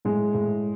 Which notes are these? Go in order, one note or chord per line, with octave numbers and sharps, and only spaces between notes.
A2 G#3
A2